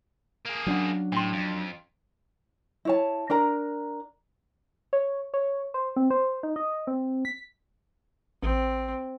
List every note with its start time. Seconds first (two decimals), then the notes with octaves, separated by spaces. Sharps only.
0.45 A#3 G#4
0.67 F#3 C#4 D4 F#5
1.12 A2 G5 C6
1.33 F2
2.85 E4 C#5 A5
3.30 D4 A#4 A#5
4.93 C#5
5.34 C#5
5.74 C5
5.96 C4
6.11 C5
6.43 D#4
6.56 D#5
6.87 C4
7.25 B6
8.43 A1 C4